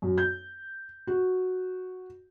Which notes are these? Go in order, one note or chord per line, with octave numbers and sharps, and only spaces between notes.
F#2
G6
F#4